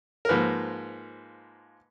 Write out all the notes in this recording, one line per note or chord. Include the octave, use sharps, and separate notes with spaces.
A#4
G#2 F3 A#3 B4